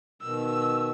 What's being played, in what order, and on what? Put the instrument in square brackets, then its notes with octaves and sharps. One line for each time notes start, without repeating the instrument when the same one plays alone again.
[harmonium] B2 D#3 [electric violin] E6